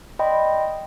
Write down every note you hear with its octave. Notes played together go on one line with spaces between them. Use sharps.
D5 D#5 G5 B5 C6